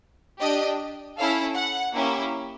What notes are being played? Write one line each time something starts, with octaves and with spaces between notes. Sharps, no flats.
D4 G4 D#5
C#4 E4 A4 F5
F#5
A#3 C#4 E4 G4